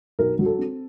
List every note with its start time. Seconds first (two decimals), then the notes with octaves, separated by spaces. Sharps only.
0.19 B1 A#4
0.39 F#3
0.46 A4
0.59 C4